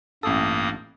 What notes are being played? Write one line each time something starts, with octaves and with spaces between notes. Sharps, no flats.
A1 G2 A#3 A4 D#6